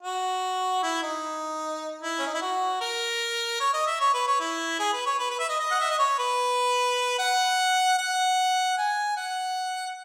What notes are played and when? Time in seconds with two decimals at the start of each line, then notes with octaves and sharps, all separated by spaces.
0.03 F#4
0.83 E4
1.02 D#4
2.02 E4
2.19 C#4
2.27 D#4
2.34 E4
2.42 F#4
2.81 A#4
3.60 C#5
3.73 D#5
3.87 E5
4.00 C#5
4.14 B4
4.27 C#5
4.40 E4
4.79 G#4
4.93 B4
5.06 C#5
5.19 B4
5.30 B4
5.39 E5
5.49 D#5
5.60 D#5
5.71 F#5
5.81 E5
5.90 D#5
5.99 C#5
6.18 B4
7.19 F#5
7.98 F#5
8.78 G#5
9.17 F#5